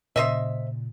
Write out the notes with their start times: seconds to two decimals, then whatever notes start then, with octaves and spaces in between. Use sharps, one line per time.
0.16 A#2 C#3 C5 D#5 E5